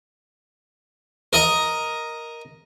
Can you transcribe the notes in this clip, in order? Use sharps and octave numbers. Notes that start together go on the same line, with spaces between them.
A#4 D#5 A#5